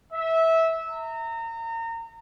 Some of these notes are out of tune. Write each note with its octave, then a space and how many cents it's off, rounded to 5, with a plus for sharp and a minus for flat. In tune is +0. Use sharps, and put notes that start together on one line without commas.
E5 -15
A#5 -30